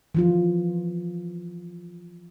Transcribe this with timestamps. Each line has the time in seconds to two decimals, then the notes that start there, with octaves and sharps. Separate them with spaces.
0.15 E3 F3 F4